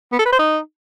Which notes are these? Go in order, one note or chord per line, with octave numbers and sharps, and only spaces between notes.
B3
A4
B4
C5
D#4